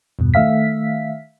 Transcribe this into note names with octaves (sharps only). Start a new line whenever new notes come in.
E2 G2 B2
D#3 A3 E5 F5 B6